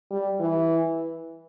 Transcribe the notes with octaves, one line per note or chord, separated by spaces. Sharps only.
G3
E3